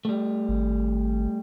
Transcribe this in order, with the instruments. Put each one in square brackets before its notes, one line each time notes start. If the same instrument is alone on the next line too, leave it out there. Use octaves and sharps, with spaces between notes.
[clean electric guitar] G3 A3
[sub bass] G#1